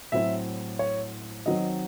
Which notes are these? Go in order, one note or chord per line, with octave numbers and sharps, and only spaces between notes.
A2 F#3 C4 E4 E5
C#5
D#3 F#3 C4 D#5